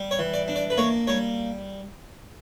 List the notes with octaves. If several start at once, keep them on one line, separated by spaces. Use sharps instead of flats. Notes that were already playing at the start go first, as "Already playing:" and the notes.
Already playing: G3
C#5
E3
D5
D4
D5
B4
A#3 C#5
G3 C#5